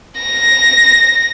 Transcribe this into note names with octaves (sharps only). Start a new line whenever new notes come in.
A#6